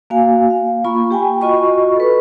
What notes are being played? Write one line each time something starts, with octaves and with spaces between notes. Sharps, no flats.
A#3 F#4 F5 G#5
F5
A#3 F4 B5 C#6
G4 G5 G#5
F4 F#4 D#5 B5 C#6
A4 B4